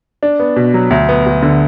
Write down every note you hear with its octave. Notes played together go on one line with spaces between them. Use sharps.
D4
B3
B2
F#3
D2
B3
D2
D3